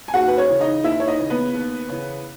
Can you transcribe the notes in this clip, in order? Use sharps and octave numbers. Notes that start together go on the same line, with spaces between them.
G#5
D#2 F#4 F#5
B4
C#4 C#5
C#3 E3
D#4 D#5
D#2 E4 E5
C#5
D#4 D#5
C#3 E3
B3 B4
D#2
C#3 E3